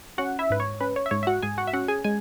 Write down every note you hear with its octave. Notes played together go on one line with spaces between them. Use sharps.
C#4 F#4 F#5
E4 E5
G#2 B4
C#5
C#4 B4
C#5
E5
G#2 C#5
E5
F#4 F#5
G#2 G#4 G#5
F#4 F#5
E5
C#4 F#4 F#5
G#4 G#5
G#3 G#5